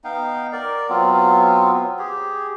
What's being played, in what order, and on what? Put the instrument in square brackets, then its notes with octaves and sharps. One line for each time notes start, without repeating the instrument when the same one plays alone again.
[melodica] B3 D#4 F5 G5
A#4 D5
F#3 B3 C4 F4
G4 G#4